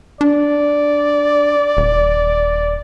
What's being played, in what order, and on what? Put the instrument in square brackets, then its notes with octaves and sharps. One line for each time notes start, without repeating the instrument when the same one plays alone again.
[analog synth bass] D4 [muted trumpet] D5
[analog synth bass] D#1